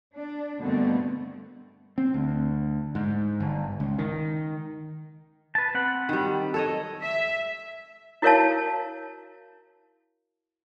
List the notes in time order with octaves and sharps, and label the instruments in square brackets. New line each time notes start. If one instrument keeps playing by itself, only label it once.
[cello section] D4
G2 B2 D3 A3 A#3 C4
[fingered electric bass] C4
D2
G#2
G1
C#2
D#3
[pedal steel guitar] B4 A5
C4 F#5 B5
[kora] D#3 G3
A4 C#5 D#5
[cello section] E5
[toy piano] E4 F#4 A#4 C#5 F5 A5